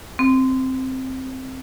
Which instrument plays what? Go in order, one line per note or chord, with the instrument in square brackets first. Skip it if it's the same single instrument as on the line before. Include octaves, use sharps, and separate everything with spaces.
[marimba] C4